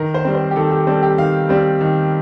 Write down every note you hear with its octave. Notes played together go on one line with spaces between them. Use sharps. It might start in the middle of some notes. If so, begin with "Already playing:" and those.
Already playing: D#3 A#4
C5
G3 C4
C5
G4
D#3 A4
G4
G3 C4 A4
G4
D#3 F5
G3 C4
D#3